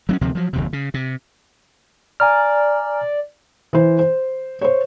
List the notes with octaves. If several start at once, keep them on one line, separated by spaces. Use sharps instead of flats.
F#3 B3 C#4
D2 C3 F3 C4
F3 F#3
F#1 D#2 C3
C#3
C3
D5 G#5 A#5 F6
E3 C5
C5
C5 C#5